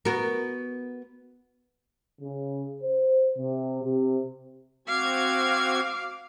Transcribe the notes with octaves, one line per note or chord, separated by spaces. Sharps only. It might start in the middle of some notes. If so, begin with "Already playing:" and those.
B3 F#4 A#4
C#3
C5
C3
C3
C4 F#4 F5 D6 G#6